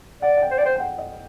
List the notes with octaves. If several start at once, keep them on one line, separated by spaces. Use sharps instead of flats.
D5 F#5
F#5
G5
C5
D5 G5
C5
G5
F#5
D#5